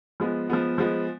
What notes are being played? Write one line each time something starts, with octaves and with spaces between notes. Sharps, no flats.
F3 G#3 B3
F3 G#3 B3
F3 G#3 B3